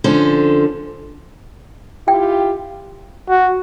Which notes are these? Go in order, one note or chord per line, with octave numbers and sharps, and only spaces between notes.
D3 F3 C#4 A4 C5
E4 F4 G4 G5
F#4